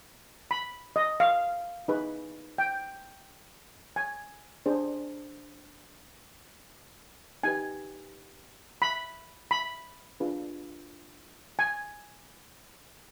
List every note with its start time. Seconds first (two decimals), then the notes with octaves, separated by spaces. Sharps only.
0.51 B5
0.96 D#5
1.20 F5
1.88 D#4 G#4 B4
2.58 G5
3.96 G#5
4.66 D4 G#4 C5
7.43 D#4 G4 B4 G#5
8.82 B5
9.51 B5
10.20 D4 F4 G#4 B4
11.59 G#5